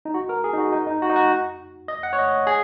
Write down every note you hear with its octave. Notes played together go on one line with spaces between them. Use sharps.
D#4
F#4
A#4
G#4
D#4
F#4
D#4
D#4
F#4
D#4
F#4
D#5
F#5
C#5
D#5
G#4